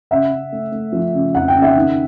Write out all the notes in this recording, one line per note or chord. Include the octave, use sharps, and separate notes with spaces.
C#3 E5 F#5
C#3
A3
A3
F3
C#3
F2 F#5
G5
C#3
E5 F#5
D#3